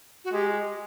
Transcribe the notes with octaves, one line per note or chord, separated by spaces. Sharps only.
F#4
G#3 G4